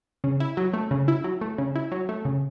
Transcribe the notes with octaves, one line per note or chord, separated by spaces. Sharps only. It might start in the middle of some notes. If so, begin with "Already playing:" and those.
C#3
E4
F#3
A3
C#3
E4
F#3
A3
C#3
E4
F#3
A3
C#3